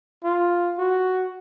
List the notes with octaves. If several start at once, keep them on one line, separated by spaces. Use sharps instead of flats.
F4
F#4